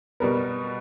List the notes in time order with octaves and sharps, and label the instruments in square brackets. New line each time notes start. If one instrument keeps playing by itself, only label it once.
[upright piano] B2 G3 B3 A#4